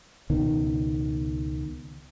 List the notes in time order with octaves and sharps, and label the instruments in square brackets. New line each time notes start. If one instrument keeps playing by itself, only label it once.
[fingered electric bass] C#2 B2 D#3